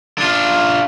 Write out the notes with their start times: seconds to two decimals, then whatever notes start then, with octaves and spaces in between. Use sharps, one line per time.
0.18 D4 F4